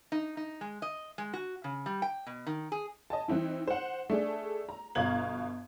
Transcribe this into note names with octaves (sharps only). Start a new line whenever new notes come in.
D#4
D#4
G#3
D#5
G#3
F#4
C#3
G3
G5
B2
D#3
G#4
D#5 G#5 A5
E3 C4 D#4 E4
C5 F#5
A3 D4 G#4
A#5
G1 B2 F5 A#5 G#6 F#7